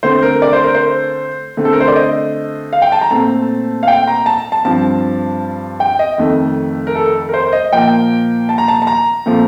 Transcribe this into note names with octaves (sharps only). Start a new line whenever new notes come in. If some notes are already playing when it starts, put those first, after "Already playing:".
D3 A3 C4 C5
A#4
D5
C5
A#4
C5
D3 A3 C4
A4
A#4
C5
D5
D#5
F5
G5
A5
A#5
A#2 A3 C4 A5
F5
G5
A#5
A5
A5
G2 F3 C4 A5
G5
D#5
F2 D#3 A3
A#4
A4
A#4
C5
D#5
A#2 F3 A#3 G5
A5
A#5
A5
A5
A#5
A#2 F3 A3 C4